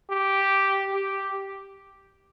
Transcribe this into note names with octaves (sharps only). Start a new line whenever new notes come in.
G4
G4